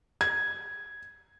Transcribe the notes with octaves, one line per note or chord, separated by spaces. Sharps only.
G#6